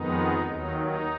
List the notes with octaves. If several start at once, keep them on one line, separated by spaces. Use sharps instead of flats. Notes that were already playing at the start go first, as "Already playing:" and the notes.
Already playing: F2 D#3 G#3 B3 D#4
D#2 D#3 F#3 D#4
D#4